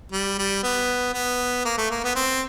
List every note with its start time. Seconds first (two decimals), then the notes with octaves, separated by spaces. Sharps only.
0.12 G3
0.38 G3
0.63 B3
1.14 B3
1.65 A#3
1.78 A3
1.91 A#3
2.04 B3
2.15 C4